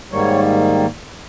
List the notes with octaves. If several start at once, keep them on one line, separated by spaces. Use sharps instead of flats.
G#2 D#3 G3 A#3 C#5